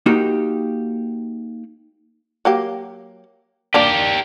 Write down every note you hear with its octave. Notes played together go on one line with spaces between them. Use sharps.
A#3 D#4 F#4 G4
F#3 A#3 G4
A#3 D4 G4 A#4 D5